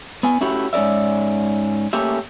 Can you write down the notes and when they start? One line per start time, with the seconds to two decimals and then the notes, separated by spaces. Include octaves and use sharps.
0.23 B3 G#5
0.41 A3 C#4 E4 F#4 G4
0.73 G#2 C#4 A#4 D5 E5
1.93 A3 A#3 C#4 G4 E5